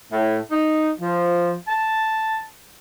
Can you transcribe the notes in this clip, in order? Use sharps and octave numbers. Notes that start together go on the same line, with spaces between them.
A2
D#4
F3
A5